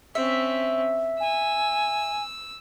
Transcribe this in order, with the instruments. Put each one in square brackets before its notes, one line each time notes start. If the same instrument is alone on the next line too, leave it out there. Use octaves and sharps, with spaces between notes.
[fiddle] C4 C#4 [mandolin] E5
[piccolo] G#5 [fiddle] E6